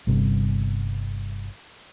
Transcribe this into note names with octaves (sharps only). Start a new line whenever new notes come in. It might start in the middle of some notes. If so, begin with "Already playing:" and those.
G1 G2 C3